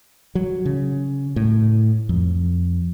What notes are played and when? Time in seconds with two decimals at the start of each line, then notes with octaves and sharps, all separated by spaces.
0.35 F#3
0.66 C#3
1.36 A2
2.09 F2